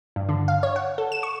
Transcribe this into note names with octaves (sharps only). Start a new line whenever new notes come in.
G2
D3
F5
C#5
F#5
A4
E7
C#6